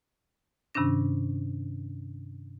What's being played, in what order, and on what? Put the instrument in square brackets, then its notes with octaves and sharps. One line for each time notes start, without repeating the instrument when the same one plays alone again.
[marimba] G2 C3 D#3 C#4 D4 A#6